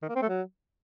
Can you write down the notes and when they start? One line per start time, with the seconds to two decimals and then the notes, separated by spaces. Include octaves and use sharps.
0.02 D#3
0.09 A#3
0.15 C4
0.22 A3
0.29 F#3